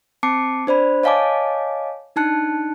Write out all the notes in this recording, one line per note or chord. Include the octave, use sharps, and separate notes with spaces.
C4 A5 D6 C7 C#7
D4 C5 D5 B5
C#5 D#5 F5 G#5 A5 D6
D4 D#4 A5 F#6 C#7